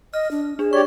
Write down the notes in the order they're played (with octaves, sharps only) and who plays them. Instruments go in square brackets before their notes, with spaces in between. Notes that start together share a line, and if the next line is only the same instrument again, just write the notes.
[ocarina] D#5 [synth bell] F6
[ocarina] D4
[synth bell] D4 [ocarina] G#4
[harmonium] G4 C#5 D5 [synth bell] C#6